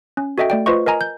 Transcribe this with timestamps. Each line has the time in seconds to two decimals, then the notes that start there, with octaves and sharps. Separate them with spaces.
0.17 C#4
0.38 F#4 A4 D#5 E5 G5
0.50 A3 D5 G5
0.66 F4 B4 C5 D#5 C#6
0.86 A#4 D#5 G#5 A#5
1.01 G6